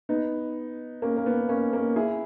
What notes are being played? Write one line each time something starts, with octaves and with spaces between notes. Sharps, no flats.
B3 D#4
A#3 C#4
A#3
B3
A#3 C#4
A#3 C#4
E4 G#4